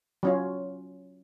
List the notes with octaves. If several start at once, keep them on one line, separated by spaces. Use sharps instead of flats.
F#3 C#4 F4